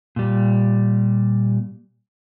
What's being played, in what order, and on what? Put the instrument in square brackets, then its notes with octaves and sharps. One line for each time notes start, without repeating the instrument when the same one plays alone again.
[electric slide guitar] A#2 G3